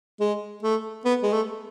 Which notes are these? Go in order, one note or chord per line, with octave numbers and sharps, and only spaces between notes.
G#3
A3
B3
G#3
A3